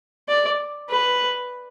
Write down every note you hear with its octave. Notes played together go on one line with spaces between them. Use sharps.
D5
B4